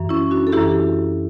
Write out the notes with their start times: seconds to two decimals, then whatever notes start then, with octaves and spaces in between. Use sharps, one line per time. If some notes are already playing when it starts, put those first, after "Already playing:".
Already playing: F#2 E3
0.09 C#4 E4
0.31 D4 F#4
0.47 A4
0.53 F#2 E3 E4 G4